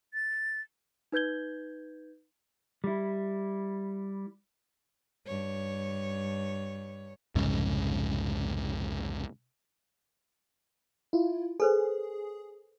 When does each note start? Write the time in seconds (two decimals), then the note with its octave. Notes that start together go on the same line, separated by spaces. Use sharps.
0.14 A6
1.12 D#4 B4 G6 G#6 G7
2.84 G3 E4
5.27 G2 C#5
7.35 C2 F2 G#2 C#3
11.13 E4 F4
11.60 G#4 A4 B4 C5